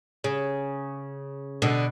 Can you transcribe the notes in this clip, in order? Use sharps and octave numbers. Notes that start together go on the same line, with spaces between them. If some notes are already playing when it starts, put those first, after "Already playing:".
C#3
B2 D3